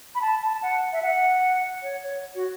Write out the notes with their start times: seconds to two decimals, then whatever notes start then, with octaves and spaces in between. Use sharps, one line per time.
0.15 B5
0.22 A5
0.43 A5
0.62 F#5
0.93 E5
1.02 F#5
1.82 C#5
2.03 C#5
2.35 F#4